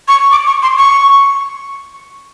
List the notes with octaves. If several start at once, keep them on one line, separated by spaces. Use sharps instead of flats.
C#6
D6
C#6
C6
C#6